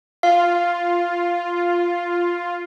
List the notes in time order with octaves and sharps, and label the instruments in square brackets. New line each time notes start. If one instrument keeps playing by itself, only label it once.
[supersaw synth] F4 [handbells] F5